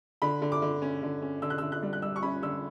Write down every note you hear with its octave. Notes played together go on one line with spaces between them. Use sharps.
D3 B5
D3
D6
D3
C#4
D3
C#4
D3 E6
F#6
D3 E6
F#6
G3
F#6
G3 E6
C#6
C#4 B5
D3 E6